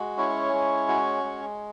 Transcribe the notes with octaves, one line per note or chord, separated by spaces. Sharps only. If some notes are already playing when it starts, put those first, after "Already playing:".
Already playing: G#3 F#4
C#4 E4 C#5
G#3
F#4
G#3